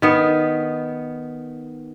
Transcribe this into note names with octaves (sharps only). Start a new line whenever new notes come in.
D#3 B3